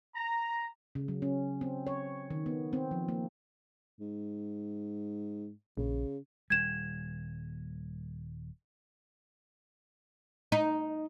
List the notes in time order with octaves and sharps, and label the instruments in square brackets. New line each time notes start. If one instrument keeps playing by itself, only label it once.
[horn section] A#5
[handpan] C#3
F#3
C#4
C4
C#5
D#3
B3
C4
F3
A#3
[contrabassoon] G#2
[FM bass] A#1 [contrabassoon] C#3
[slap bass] D#1 G3 [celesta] G#6 E7
[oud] D#4